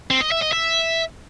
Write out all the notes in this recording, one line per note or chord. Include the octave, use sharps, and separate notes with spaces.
C4
D#5
E5
D#5
E5